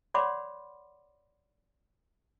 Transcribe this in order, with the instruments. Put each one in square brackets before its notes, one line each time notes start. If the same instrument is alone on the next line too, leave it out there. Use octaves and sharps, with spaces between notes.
[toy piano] C#5 D5 F#5 B5 C6 D6